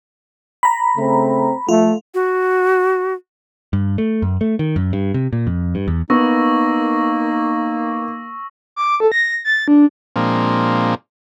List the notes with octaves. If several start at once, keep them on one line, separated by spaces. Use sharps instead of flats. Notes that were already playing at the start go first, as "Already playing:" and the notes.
A#5 B5
C#3 A3 C4
F3 A3 F4
F#4
G2
A3
F#2
A3
D#3
F#2
G2
C3
A#2
F2
G2
E2
A#3 B3 D#4 C#6 E6 A#6
D6
A4
A#6
A6
D4
A#2 F3 G#3 A#3 C4 D4